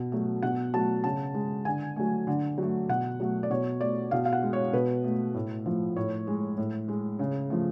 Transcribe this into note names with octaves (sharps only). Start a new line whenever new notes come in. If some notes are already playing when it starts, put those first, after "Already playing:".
Already playing: B2
F#3 A3
B2 F#5
F#3 A3 A5
C#3 A5
G#3
D3 G#5
F#3 A3
D3
F#3 A3
B2 F#5
F#3 A3
D5
B2 C#5
A3 D5
B2 F5
F5
F#5
G#3
C#5
B2 B4
A3
A2
F3 A3
A2 C#5
G#3
A2
G#3
C#3
F3 A3